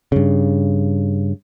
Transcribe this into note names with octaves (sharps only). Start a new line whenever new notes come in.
G2 C#3